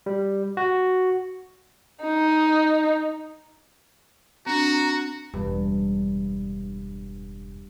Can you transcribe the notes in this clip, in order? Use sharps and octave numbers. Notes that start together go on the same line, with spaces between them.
G3
F#4
D#4
C4 D4 F#4 A#5
E1 G2